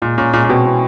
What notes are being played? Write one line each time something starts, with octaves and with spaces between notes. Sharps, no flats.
A#2 G#3
A#2 C#4
A#2 G#3
A#2
B2 C4
E3